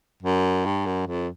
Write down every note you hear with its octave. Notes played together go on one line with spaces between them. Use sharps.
F#2
G2
F#2
F2